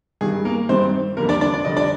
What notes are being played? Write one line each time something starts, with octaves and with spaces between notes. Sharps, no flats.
G2 D#3 G3 G#4
A#3 A#4
G2 D#3 G3 C4 C5
F2 D3 G3 A#3 A#4
D4 D5
D4 D5
D5
F2 D3 G3 D#5
D4 D5